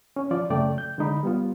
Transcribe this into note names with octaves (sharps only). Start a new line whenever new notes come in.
C#4
F3 F4 D5
F#2 C#3 A3 D5 G5
G6
D3 G#3 D#4 B5
G3 B3 F4